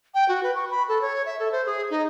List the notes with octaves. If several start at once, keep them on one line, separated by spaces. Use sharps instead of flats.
G5
F#4
B4
C#6
B5
A4
C#5
E5
A4
C5
G#4
D#4